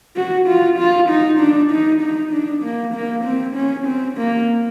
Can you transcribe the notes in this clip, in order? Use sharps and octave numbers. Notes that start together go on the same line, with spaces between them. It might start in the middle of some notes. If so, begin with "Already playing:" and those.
F#4
F4
F4
D#4
D4
D#4
D#4
D4
A#3
A#3
C4
C#4
C4
A#3